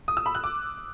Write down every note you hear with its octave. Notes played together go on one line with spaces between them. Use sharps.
D#6
E6
B5
F#6
D6